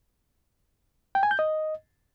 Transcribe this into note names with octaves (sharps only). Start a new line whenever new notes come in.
G5
G#5
G6
D#5